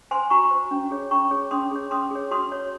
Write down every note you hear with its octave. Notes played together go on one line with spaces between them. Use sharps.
C5 G#5 C6
F#4 A#5 C#6
C5
C#4
G#4 C#5
C#4 A#5 C#6
G#4 C#5
C#4 C6 D#6
G#4 C#5
C#4 C6 D#6
G#4 C#5
F#4 C6 D#6
C#5